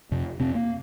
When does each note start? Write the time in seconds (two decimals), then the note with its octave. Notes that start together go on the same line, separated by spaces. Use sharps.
0.11 F2 C3
0.40 F2 C3 C4
0.55 A#3